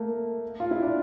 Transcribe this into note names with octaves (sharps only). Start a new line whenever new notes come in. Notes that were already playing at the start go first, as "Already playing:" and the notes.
Already playing: A3 A#3
F4
E4
D4